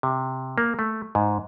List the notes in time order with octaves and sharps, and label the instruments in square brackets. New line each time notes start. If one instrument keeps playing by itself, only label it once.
[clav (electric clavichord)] C3
A#3
A3
G#2